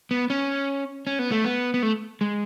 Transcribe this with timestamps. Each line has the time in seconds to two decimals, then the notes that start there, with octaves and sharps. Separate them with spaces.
0.11 B3
0.30 C#4
1.07 C#4
1.19 B3
1.32 A3
1.44 B3
1.74 B3
1.83 A3
2.21 G#3